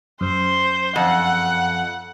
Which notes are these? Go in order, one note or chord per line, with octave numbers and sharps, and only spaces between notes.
F#2 C5
F2 F#5